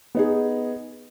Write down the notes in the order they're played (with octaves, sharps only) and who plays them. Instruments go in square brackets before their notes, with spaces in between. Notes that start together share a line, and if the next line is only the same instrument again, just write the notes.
[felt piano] B3 D#4 G#4